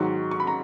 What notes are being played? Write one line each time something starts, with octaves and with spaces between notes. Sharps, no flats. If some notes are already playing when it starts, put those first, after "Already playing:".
Already playing: G#2 D#3 F#3 C#6
C#6
B5
A#5